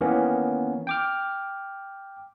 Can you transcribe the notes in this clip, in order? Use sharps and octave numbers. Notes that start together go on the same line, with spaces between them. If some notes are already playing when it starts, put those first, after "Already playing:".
D#3 E3 A#3 B3 C#4
G5 D6 F6